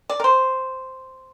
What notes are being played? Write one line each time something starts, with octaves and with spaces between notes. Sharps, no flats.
D5
A#4
C5